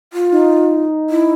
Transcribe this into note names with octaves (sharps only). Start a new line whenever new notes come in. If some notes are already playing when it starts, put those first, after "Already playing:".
F4
D#4
E4